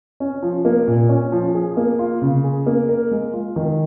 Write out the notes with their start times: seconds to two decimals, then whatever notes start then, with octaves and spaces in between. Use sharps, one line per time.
0.20 C#4
0.42 F3
0.65 A#3
0.87 A#2
1.09 C#4
1.32 F3
1.54 G#4
1.77 A#3
1.99 F4
2.22 C#3
2.44 G#4
2.66 A#3
2.89 A#4
3.11 G#3
3.33 F4
3.56 D#3